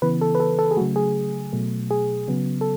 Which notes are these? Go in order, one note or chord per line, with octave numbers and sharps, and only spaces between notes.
C#3 E3 B3 B4
A4
B4
A4
A4
G#4
C#3 F#3 A3 F#4
G#4
B2 F#3 A3
G#4
C#3 F#3 B3
A4